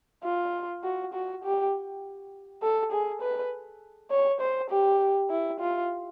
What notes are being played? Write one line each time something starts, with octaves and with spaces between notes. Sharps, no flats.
F4
F#4
F#4
G4
A4
G#4
B4
C#5
C5
G4
E4
F4